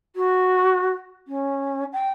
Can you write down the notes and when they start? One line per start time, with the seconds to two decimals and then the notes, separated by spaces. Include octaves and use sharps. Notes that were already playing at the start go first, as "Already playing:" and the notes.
0.16 F#4
1.27 C#4
1.93 G5